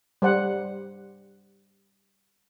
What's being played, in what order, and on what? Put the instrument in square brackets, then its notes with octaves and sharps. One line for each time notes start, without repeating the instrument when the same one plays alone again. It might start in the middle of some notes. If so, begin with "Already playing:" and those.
[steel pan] G3 C5 F#5